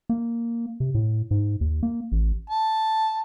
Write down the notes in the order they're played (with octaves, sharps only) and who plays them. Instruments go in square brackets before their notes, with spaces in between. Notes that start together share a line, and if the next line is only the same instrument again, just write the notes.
[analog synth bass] A#3
C3
A2
G#2
D#2
A#3
A1
[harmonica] A5